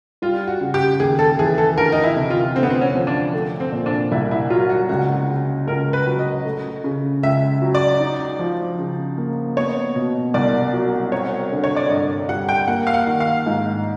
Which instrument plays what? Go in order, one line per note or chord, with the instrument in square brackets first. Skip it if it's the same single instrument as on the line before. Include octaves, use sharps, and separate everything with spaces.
[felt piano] G3 [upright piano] F4
[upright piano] F#4
[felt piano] C#3
[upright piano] G4
[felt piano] D#2 [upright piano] G#4
[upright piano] A4
[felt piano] E3 [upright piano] G#4
[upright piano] A4
[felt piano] D2 [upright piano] A#4
[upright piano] D#4
E4
[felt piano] C3
[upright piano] F4
[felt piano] D2 [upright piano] C4
[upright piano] B3
C4
C#4
[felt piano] F3
[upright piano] D4
[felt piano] A3
[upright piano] C4
[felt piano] A#2
[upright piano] D4
[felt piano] C2 [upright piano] E4
[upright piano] E4
[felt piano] F#3 [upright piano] F4
[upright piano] F#4
[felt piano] C#2 [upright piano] F#4
[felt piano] C#3
[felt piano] C#2 [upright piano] A#4
[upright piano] B4
[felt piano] F#3
[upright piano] D#5
[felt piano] A3
C#3
[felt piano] C#2 [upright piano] E5
[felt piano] F#3
[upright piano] D5
[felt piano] D#4
F3
C#3
A#3
[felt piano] B3 [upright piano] C#5
[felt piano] B2
[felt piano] C2 [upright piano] D5
[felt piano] F#3
[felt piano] C4 [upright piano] C#5
[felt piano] D3
[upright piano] C#5
D5
[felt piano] G2 [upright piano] D#5
[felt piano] G3 [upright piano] F#5
[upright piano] G5
[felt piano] A#3 [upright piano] F#5
[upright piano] F5
F#5
[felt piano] D#3
[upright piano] F5
[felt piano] G#2